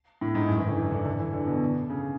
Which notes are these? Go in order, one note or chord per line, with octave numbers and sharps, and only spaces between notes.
A2
G#2
F#2
E3
D3
E3
D3
D3
E3
D3
B2
C#3